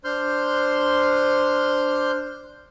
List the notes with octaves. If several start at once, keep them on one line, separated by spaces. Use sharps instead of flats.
D4 C5 C6 F6 G6